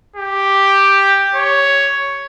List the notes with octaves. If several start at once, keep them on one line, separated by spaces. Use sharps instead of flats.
G4
C#5